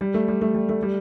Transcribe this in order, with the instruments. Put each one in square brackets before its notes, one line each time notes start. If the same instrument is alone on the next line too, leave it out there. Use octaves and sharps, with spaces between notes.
[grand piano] G3
A3
G3
A3
G3
A3
G3